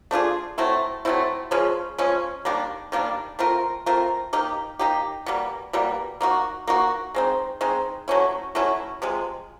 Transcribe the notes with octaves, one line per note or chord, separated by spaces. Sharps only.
A3 D4 F4 G#4
F#3 A3 C4 E4
F#3 A3 C4 E4
C#3 F3 G#3 C#4
C#3 F3 G#3 C#4
D#3 G3 A#3 D4
D#3 G3 A#3 D4
A3 C4 F4 A#4
A3 C4 F4 A#4
A#3 D#4 G4
A#3 D#4 G4
B2 G3 A#3
B2 G3 A#3
A#3 D#4 F#4
A#3 D#4 F#4
G#3 C4 D#4
G#3 C4 D#4
F#3 A3 C#4 E4
F#3 A3 C#4 E4
C3 F3 G#3